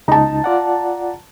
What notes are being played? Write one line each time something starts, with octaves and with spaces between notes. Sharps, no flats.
C#2 D#4 A5 A#5
F4 D5 F#5